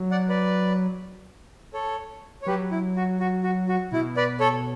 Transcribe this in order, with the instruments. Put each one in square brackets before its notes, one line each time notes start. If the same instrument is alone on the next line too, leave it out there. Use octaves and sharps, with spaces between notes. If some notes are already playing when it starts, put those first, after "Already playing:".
Already playing: [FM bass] F#3
[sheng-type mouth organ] D5 F#5
B4 D5
A4 C#5
C#5
[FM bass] F#3 [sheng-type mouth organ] G4 B4
[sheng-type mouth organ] E4
F#4
F#4
F#4
F#4
[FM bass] B2 [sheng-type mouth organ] E4
[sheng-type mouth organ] B4 D5
A4 C#5